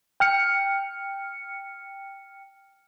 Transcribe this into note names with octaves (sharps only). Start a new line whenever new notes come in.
G5 F6 C#7